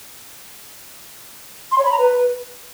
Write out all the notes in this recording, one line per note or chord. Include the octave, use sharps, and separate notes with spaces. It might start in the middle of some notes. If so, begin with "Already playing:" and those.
C6
C#5
B5
A#5
B4